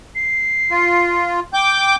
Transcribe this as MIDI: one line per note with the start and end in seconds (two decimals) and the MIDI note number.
0.15 1.30 96
0.71 1.40 65
1.54 1.96 79
1.54 1.96 86
1.54 1.96 91